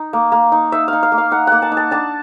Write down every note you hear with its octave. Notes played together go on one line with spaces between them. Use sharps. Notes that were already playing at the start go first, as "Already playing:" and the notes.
Already playing: D#4
A#3
A#3
D#4
D#4 E5
D#4 F5
F5
A#3
F5
D#4 F#5
A#3 F#5
A5
D#4
A5
D4 A5